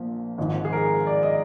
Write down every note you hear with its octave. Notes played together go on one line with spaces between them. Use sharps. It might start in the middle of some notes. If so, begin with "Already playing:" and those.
Already playing: A#1 A#2 F3
G#1 G#2 F3
G#4
A#4
D5
D#5